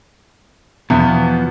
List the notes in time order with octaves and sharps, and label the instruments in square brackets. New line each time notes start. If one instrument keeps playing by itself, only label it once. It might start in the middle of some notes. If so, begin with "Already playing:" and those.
[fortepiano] E2 [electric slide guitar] B2 F3 B3